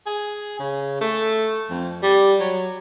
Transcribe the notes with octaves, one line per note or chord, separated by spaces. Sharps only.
G#4
C#3
A3
F2
G3
F#3